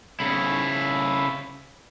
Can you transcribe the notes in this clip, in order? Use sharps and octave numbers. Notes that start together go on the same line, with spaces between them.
C#3 E4